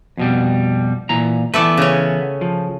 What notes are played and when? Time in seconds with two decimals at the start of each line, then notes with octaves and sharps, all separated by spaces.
0.17 F2 B2 G3
1.09 A#2 E3 A#5
1.54 E3 A3 B3 A4 B4 D5
1.77 C#3 C#4
2.41 F3